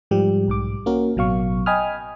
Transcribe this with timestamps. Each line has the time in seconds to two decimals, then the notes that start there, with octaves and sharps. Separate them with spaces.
0.11 G#2 F3 G3 G4
0.48 B1 G#2 D6
0.86 A#3 C#4 F#4 A#4
1.16 A1 B2 F#3 F5 C#6
1.66 D#5 G5 G#5 B5 D#6 F6